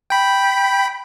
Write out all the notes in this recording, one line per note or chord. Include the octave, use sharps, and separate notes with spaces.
G5 B5